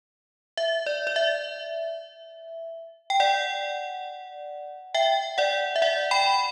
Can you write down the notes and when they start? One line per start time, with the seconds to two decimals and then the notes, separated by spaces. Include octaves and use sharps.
0.57 E5
0.86 D5
1.07 D5
1.16 E5
3.10 G5
3.20 D5 F#5
4.94 E5 G5
5.38 D5 F#5
5.76 E5
5.82 D5 F#5
6.11 G5 B5